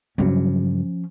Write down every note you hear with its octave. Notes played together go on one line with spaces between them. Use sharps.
G2 C#3 F3 F#3 C#4